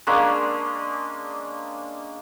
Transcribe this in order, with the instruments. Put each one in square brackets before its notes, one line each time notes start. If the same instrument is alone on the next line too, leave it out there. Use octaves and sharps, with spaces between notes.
[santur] G#3 A#3 C#4 D4